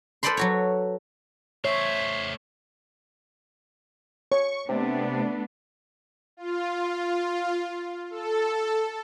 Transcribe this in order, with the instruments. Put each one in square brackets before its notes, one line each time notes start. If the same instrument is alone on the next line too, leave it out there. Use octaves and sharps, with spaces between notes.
[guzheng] A4 B4 C5 D5 B5 C6
F#3 F#4 C#5
[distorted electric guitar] A3 C5 [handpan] C#5 [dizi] E5
[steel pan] C#5 [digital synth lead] C#6
[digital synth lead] C3 [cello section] A3 B3 D4
[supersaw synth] F4
A4